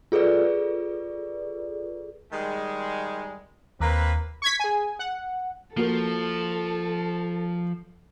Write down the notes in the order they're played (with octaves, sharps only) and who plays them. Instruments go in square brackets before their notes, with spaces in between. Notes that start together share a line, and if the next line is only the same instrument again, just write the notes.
[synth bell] F4 G#4 A4 B4 D5
[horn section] D#3 G3 G#3
[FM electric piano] D#2 A#5 [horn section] A#3 C4 B4
[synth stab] C#6 G#6 B6
G#4 G#5
F#5
[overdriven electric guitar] F3 [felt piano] A#3 F#4 A#4 [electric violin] A4